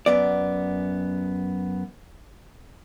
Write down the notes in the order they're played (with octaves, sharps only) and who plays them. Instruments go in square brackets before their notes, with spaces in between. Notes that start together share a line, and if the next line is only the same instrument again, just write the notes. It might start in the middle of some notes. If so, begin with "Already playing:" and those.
[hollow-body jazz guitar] F#2 B3 D5